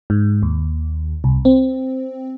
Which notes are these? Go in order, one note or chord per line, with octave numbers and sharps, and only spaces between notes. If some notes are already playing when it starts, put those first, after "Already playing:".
G#2
D#2
C2
C4